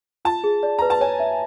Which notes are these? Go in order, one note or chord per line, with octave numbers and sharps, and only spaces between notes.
F4 A5
G#4
D5
B4 A#5
A5
C#5 G#5
E5